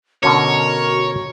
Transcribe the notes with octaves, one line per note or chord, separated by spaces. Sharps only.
B2 D3 C#4 F#4 A#4 C#5